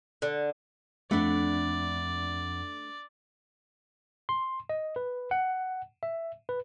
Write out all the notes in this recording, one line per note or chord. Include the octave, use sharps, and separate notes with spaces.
D3
F2 A3 D4 D5 F#5 B5
C6
D#5
B4
F#5
E5
B4